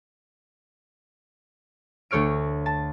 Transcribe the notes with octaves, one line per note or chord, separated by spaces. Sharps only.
D2 A3 C#5 F6 D7
A5